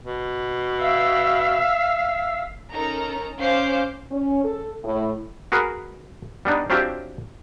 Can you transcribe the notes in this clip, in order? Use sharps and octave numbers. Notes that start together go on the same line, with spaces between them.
B2
E5 F5 E6
C#4 D#4 A4 A#4 A#5
C#4 C5 F5 D6 G6 C7
C#4
A4
A2
F#4 G#4 A#4 B4
G3 B3 D4 D#4
F#3 C4 D4 F4 G4 E5